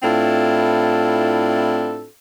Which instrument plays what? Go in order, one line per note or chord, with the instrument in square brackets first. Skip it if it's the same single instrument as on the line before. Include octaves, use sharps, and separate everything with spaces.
[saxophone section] A2 C4 D4 E4 F4 A4